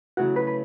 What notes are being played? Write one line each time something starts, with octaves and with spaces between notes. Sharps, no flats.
C#3 F#3 A3 C#4 E4 F#4
B4
B4